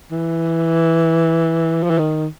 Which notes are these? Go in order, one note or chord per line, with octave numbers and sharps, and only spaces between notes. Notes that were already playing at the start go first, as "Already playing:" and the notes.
E3
F3
E3
D#3